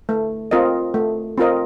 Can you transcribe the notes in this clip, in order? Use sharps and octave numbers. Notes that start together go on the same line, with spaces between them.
A3
C4 F4 A#4 D#5
A3
C4 F4 A#4 D#5